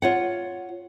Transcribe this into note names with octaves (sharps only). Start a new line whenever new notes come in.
F4 C#5 F#5